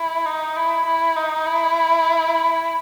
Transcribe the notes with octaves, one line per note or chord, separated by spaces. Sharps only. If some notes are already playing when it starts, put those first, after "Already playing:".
Already playing: E4
D#4
E4
E4
D#4
E4